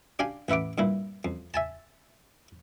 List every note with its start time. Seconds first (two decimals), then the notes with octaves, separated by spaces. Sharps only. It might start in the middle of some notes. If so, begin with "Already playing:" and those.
0.19 D4 G4 F5 G#5
0.49 A1 B4 E5 F#5 D6
0.78 G2 A#2 E4
1.25 F2
1.54 E5 G#5 A5